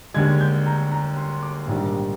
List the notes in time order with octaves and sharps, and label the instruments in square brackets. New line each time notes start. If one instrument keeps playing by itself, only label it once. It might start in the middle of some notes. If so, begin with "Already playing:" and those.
[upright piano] D#2 D3 G#3 G#6
G6
A#5
A#5
C6
D6
A#1 G#2 D#3 G3